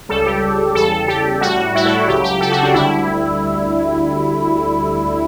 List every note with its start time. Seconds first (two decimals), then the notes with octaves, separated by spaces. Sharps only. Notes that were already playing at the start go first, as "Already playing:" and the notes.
0.09 C#2 C#3 G3 A4
0.26 G4
0.75 E2 C#3 G3 A4
0.92 A4
1.08 G4
1.41 A2 G3 F#4
1.75 E4
1.85 A4
1.97 A4
2.08 C#2 C#3 F#3 G4
2.24 G4
2.40 A4
2.51 F#4
2.63 D4
2.74 D2 D3 G3 E4